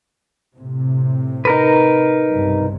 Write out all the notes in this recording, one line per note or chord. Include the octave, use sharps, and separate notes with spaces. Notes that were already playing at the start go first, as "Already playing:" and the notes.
A2 C3
D#4 A#4 B4
B1 G2 C3